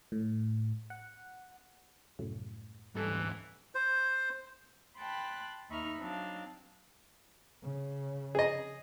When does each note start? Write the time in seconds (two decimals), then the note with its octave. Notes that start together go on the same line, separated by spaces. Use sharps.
0.12 A2
0.90 F#5
2.19 C2 F#2 A2
2.95 D2 G#2 E3 G3 A4
3.75 C5
4.99 G5 A5 B5 C6 F#6
5.69 D#2 D#4 E5 B5 C#6 F6
5.98 F#3 C4 D4 D#4 F5
7.62 C#3
8.35 G#4 D#5